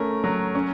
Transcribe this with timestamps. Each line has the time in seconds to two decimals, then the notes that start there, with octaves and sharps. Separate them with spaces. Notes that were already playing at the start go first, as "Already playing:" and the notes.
Already playing: A3 C#4 A#4
0.24 F#3
0.55 C#4